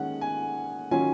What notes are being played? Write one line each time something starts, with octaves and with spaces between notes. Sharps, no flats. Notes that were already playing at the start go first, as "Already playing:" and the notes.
Already playing: D#3 G#3 C#4 F#5
G#5
D#3 F#3 C#4 F4 G#5